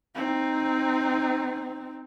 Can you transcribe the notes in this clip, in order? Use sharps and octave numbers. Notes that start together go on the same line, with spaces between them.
C4 D#4